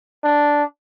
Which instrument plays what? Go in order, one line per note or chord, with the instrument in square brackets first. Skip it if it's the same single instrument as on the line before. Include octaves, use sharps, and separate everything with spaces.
[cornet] D4